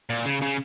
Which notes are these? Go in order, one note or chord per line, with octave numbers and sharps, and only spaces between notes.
A#2
C#3
C#3